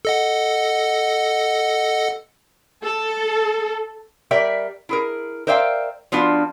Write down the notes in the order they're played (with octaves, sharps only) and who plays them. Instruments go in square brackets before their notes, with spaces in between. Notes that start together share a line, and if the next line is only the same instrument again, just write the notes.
[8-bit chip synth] A4 D#5 F#5
[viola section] A4
[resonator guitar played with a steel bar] G3 A#4 D5 E5 G5
E4 G#4 A#4
A#4 C5 D5 E5 F5 G5
F3 B3 D4 F4 F#4